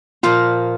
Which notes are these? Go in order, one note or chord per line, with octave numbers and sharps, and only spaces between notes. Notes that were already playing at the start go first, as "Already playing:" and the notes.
A#2 F3 A#3 F4